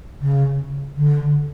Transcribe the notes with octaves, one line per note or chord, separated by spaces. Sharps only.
C#3
D3